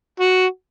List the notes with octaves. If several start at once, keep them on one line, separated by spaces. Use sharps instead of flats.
F#4